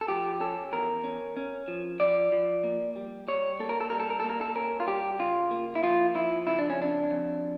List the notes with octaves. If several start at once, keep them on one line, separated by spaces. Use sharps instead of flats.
A4
F3 G4
C#4 A4
E2 A#4
C#4
C#4
F3
F3 D5
F3
A#3
G3
G3 C#5
A#3 A4
A#4
A4
G3 A#4
A4
A#4
A#3 A4
A#4
A4
C#4 A#4
F4
G3 G4
C#3 F4
A#3
E4
F3 F4
F3 E4
C#3 E4
D4
C#4
F2 D4
F2